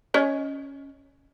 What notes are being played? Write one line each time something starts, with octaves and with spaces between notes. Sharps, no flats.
C#4 C#5 D#5